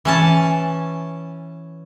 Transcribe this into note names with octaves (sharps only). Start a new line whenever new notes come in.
E3 C#4 A5